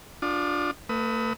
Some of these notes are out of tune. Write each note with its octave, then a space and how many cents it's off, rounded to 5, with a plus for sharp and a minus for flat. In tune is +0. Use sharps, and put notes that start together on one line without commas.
D4 +0 F4 +30 D#6 -35
A3 +45 B4 +15 D#6 +35